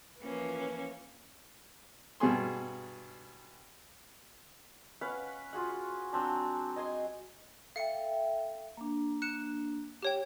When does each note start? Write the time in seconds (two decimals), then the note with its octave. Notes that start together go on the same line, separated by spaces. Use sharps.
0.23 E3 F3 A#3 C#4 B4
2.20 G2 B2 C#4 G#4 C6
5.01 C#4 B4 F5 F#5
5.53 F4 F#4 G#4 F#5
6.13 F#3 C4 D4
6.76 D#5 G#5 C6
7.76 A4 E5 F5 G5 C#7
8.77 A#3 D4
9.22 F#6 C#7 E7
10.02 G4 C#5 G5